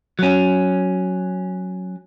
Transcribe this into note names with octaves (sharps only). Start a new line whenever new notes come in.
F#3 C#4